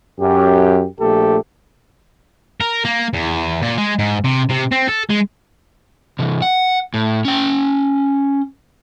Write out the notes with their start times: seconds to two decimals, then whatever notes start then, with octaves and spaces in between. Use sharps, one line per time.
0.20 F#2 G4
1.00 A#1 A3 G4 A4
2.61 A#4
2.85 A#3
3.14 E2
3.62 A#2
3.78 G#3
3.99 G#2
4.25 C3
4.50 C3
4.72 C4
4.88 A4
5.10 G#3
6.19 C3 E3
6.42 F#5
6.94 A2
7.25 C#4 G5